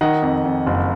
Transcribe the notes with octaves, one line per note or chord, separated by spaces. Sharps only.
D#3 D#5 F#5
F2
F2
F#1